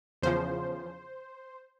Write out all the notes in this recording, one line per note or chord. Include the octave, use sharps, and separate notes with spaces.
E2 C#3 F3 C5